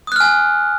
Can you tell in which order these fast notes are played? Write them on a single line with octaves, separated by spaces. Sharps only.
D#6 F#6 F6 G#5